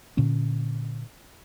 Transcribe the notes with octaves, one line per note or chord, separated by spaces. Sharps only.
A#2 D3 C#4